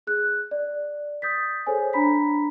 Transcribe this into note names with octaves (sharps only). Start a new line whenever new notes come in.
G#4 F#6
D5
D#6 G6 A6 B6
G#4 A4 C5 C#5 G#5
D4 A#5 B5 B6